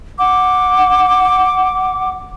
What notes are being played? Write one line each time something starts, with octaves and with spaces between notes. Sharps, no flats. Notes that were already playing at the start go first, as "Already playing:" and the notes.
F#5 D6